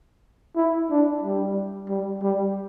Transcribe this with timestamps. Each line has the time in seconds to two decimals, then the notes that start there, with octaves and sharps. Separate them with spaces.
0.56 E4
0.90 D4
1.23 G3
1.89 G3
2.22 G3